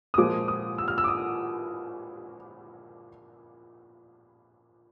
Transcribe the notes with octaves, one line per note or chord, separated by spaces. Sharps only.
D#6
A#2 F3 G#3 D6
D#6
E6
F6
E6
D6
D#6